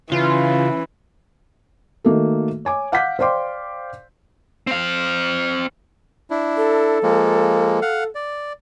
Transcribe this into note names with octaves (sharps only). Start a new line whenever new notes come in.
C#3 E3 C#4 F4
D#3 A3 A#3 F#4 A4
C#5 G#5 D6
F5 F#5 D6 G6 B6
C5 D5 F5 G5 C6 D6
C4 F5
D4 E4
A4
F3 G#3 A#3
F5 F#5
D5